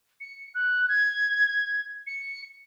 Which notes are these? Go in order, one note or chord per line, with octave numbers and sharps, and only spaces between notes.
C#7
F#6
G#6
C#7